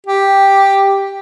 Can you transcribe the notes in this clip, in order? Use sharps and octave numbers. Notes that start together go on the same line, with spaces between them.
G4